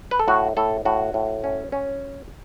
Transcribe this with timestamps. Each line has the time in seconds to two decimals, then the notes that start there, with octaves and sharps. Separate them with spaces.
0.11 B4
0.19 A4
0.28 A2 F#4
0.57 A2 A4
0.85 A2 F#4
1.14 A2
1.44 C#4
1.72 C#4